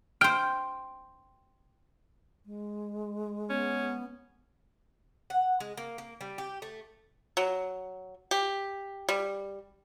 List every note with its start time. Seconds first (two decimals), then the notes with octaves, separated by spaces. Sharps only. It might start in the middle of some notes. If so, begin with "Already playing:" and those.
0.21 C5 G5 F6 D7
2.46 G#3
3.50 B3 C#4
5.30 F#5
5.60 G#3
5.77 A#3
5.98 A#3
6.21 G3
6.38 G4
6.62 A3
7.37 F#3
8.31 G4
9.09 G3